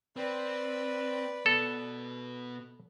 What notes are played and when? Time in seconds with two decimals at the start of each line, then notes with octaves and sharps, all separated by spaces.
0.16 C4 B4 D5 B5
1.46 B2 B3 A4